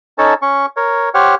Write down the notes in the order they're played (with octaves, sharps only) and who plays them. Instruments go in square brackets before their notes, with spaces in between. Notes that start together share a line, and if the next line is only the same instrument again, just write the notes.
[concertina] C#4 D#4 A4 C#5 A5
C#4 C#6
A#4 C#5
G4 C5 C#5 F#5 F6